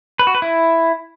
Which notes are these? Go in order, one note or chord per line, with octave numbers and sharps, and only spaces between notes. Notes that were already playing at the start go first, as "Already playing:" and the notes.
B4
F#4
B4
E4